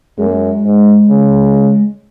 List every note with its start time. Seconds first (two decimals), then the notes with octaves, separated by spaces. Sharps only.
0.18 F#2 G#3
0.26 A#3
0.33 G#3
0.64 G#2
1.10 C#3